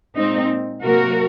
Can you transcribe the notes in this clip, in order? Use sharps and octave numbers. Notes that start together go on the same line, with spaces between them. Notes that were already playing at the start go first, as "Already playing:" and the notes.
A#2 G#3 C4 D#4
C3 F#3 A#3 F#4 A#4